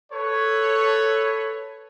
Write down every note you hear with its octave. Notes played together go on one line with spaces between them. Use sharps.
A4 B4 C#5